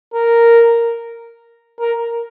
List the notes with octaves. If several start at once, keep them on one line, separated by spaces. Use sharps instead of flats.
A#4
A#4